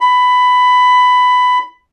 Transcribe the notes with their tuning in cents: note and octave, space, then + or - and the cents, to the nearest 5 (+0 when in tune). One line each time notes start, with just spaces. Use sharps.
B5 +15